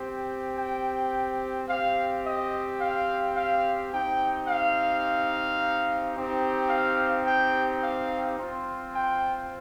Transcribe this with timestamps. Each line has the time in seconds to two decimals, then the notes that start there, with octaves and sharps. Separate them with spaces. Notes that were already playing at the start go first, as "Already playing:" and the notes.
Already playing: C4 G4
0.56 G5
1.68 C4 G4 F5
2.24 D#5
2.80 F5
3.35 F5
3.91 C4 D#4 G4 G5
4.48 F5
6.15 C4 D#4 G4
6.70 F5
7.26 G5
7.83 F5
8.38 C4 F4
8.95 G5